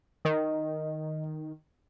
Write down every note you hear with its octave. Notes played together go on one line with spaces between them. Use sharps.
D#3 D#5